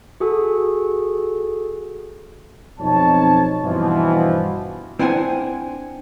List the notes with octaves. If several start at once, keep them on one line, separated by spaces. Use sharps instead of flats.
F#4 G#4 A4
B1 F2 C4 D#4 C#5 A5
G2 B2 E3 F3
C4 D4 E4 C5 F#5 G#5